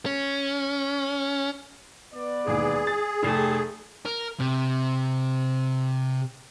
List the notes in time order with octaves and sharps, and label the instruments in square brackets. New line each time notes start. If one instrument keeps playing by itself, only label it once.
[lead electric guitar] C#4
[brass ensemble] B3 B4 D5
[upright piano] E1 D#2 [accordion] G#4
[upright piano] A6
[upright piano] F1 C7 [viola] A3 [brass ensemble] G4
[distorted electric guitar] A#4
C3